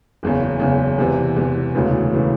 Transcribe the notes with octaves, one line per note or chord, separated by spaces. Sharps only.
F#1 E2 C#3
F#1 E2 C#3
E2 C3 E3
E2 C3 E3
E1 D2 C#3 E3
C#3 E3